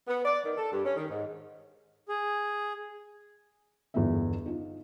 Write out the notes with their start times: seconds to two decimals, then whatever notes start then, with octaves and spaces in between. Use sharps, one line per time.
0.08 B3
0.25 D5
0.44 D#3
0.58 A4
0.71 G2
0.85 C#4
0.97 D#3
1.10 G#2
2.08 G#4
3.94 G1 E2 G#3 B3 F4 E5
4.46 D#4 F4